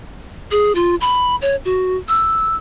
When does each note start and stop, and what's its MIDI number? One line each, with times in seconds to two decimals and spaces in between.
0.51 0.74 68
0.75 0.95 65
1.01 1.36 83
1.42 1.56 73
1.65 1.97 66
2.09 2.56 88